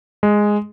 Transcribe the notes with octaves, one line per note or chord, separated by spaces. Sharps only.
G#3